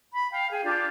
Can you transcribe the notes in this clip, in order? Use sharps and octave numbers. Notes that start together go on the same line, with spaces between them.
B5
F5 G5
G#4 G5
D4 F4 G4 D5